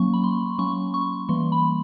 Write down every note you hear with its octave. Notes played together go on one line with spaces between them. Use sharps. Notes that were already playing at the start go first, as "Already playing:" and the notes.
Already playing: F#3 A#3 C#4 C#6
B5
C6
F#3 A#3 C#4 C#6
C#6
E3 G3 A#3 C6
B5